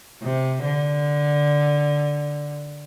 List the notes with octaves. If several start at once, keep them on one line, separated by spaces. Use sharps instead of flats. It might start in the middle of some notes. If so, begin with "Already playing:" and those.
C3
D3